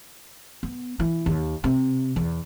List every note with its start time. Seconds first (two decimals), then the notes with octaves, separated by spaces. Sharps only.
0.63 B3
1.00 E3
1.26 D#2
1.64 C3
2.16 E2